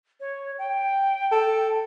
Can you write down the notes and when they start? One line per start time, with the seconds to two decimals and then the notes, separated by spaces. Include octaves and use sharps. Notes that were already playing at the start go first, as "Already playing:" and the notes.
0.20 C#5
0.58 G5
1.32 A4